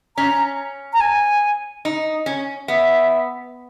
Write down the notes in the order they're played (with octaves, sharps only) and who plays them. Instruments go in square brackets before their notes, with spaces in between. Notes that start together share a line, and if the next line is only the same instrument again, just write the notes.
[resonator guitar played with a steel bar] C#4 [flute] A#5
[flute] A#5
G#5
[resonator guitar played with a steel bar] D#4
C#4
[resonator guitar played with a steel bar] B3 [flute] E5